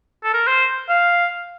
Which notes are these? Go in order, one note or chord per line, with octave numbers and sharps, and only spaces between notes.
A4
A#4
C5
F5